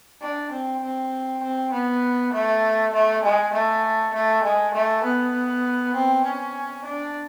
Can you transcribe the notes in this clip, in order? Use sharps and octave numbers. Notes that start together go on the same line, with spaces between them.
D4
C4
C4
C4
B3
A3
A3
G#3
A3
A3
G#3
A3
B3
C4
C#4
D4